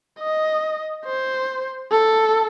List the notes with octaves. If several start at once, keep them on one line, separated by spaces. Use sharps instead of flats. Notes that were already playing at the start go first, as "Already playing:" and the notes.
D#5
C5
A4